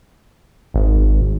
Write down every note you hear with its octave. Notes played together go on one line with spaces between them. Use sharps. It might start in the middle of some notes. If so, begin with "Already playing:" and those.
G#1